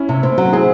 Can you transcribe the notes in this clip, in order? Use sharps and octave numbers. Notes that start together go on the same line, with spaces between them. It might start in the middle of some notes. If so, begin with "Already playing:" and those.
Already playing: C#4 E4
C3
C4
F#3
C4 E4 G#4